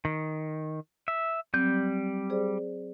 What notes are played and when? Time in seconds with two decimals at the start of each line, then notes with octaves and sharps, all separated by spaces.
0.05 D#3
1.08 E5
1.54 F#3 G3 C4 G6
2.30 G#4 C5 D5